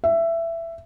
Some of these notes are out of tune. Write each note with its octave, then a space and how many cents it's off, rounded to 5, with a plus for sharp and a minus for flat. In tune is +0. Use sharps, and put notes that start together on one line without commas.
E5 +15